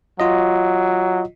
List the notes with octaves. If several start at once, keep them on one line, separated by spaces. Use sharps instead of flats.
F#3 F4 D#5